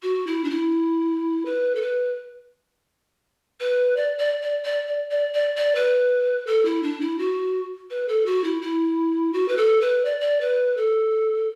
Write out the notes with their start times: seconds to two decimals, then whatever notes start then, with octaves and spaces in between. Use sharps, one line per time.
0.02 F#4
0.26 E4
0.44 D4
0.50 E4
1.45 B4
1.75 A4
1.81 B4
3.60 B4
3.96 D5
4.19 D5
4.42 D5
4.64 D5
4.88 D5
5.11 D5
5.34 D5
5.57 D5
5.75 B4
6.46 A4
6.65 E4
6.83 D4
7.00 E4
7.18 F#4
7.90 B4
8.08 A4
8.26 F#4
8.44 E4
8.61 E4
9.33 F#4
9.48 B4
9.57 A4
9.81 B4
10.05 D5
10.20 D5
10.40 B4
10.77 A4